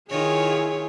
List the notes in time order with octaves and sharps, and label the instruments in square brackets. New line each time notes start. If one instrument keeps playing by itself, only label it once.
[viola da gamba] D#3 F4 C#5 [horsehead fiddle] E4 G#4